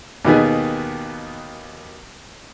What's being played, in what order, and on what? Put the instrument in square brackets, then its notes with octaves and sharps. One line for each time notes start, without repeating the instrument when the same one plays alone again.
[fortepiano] D#2 B2 D#3 G#4 B4